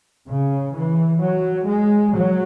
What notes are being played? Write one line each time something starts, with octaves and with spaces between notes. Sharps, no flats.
C#3
E3
F#3
G#3
F#3